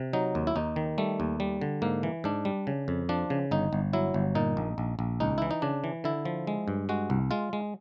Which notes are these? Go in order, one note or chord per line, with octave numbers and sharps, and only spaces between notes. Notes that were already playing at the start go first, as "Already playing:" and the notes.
Already playing: C3
F#3 D#4
D#2
E4
D#2 D#4
D#3
G3 A3
D#2
G3
D3
G#2 A#3
E3
G#2 D4
G3
C#3
F2
F3 D4
C#3
G1 D#4
G1
F#3 E4
G1
A#2 D#4
A#1
A#1
A#1
C#2 D#4
E3 E4
D#4
C#3 D4
E3
D3 E4
F3
G#3
G2
G#3 F#4
C2
G#3 F4
G#3